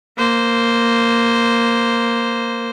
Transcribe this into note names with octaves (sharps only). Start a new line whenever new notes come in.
A#3 C5